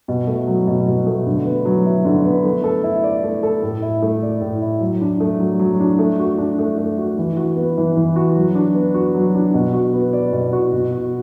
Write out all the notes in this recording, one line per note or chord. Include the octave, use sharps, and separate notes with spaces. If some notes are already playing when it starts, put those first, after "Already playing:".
B2
A3
F#3
B2
B2
A3
D3
B3
F#3
E4
D3
B3
A3
A4
E4
D5
A3
A4
A2
E4
A3
D5
A2
E4
F#3
D4
A3
F#3
F#3
D4
A3
F#4
D4
A3
A3
F#4
E3
F#4
B3
E3
E3
F#4
F#3
D4
B3
F#4
F#3
D4
B2
F#4
B3
D5
B2
F#4
B2
F#4